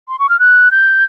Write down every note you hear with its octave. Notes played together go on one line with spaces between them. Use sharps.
C6
C#6
F6
F#6
G6